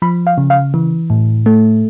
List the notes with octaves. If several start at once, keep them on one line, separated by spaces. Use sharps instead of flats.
F3 B5
F5
C#3
F5
E3
A2
A3